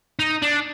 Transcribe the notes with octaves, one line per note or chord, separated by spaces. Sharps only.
D#4
D4